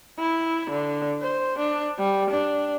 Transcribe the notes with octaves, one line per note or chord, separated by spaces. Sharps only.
E4
D3
C5
D4
G3
D4